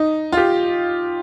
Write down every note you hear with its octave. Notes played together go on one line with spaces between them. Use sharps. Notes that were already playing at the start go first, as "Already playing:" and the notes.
Already playing: D#4
F4
G4